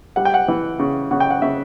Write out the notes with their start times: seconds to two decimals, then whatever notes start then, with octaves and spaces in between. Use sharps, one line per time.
0.16 G3 F#5
0.25 G5
0.34 F#5
0.48 E3
0.79 C#3
1.11 C#3 F#5
1.20 G5
1.30 F#5
1.42 C#3 E5